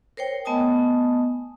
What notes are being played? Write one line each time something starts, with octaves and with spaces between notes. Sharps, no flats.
A#4 C5 C#5 G5
A3 B3 D#5 G#5 A5 D#6